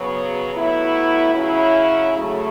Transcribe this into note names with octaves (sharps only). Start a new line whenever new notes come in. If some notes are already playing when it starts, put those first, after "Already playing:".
Already playing: C#3 F#3 B3
A2 F#3 B3 E4
C#3 F#3 C#4 E4
C#3 F#3 A3